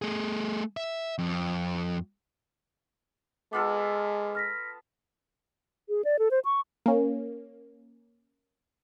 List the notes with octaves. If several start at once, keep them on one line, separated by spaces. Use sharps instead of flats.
A3 G#4
E5
F2
G#3 B3 F4 A4 D6
F6 A#6 B6
G#4
D5
A4
C5
C#6
A#3 C#4